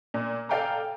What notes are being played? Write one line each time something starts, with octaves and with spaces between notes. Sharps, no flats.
A#2
A4 D5 F5 G5 G#5 A#5